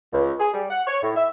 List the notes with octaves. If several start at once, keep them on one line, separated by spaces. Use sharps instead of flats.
C#2
G#4
G3
F#5
C#5
A2
E5